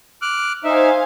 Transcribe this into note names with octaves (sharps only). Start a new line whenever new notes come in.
D6 F6 F#6
D#4 C5 E5 F5 G#5